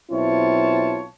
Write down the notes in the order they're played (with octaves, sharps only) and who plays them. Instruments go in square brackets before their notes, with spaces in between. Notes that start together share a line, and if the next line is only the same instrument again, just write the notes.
[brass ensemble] B1 C4 E4 F4 C#5 A5